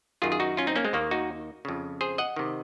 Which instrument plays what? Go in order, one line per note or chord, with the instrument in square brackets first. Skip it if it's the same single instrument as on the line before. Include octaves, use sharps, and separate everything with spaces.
[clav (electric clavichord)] F#2 D#3 F4 G#4
G#4
D#4 F#4
C#4 F4
C4 D#4
A#3 C#4
G#3 C4
D#2 D#3 A#3
D#4 F#4
F2 C#3
G#4 C5
D#5 F#5
C3 D#3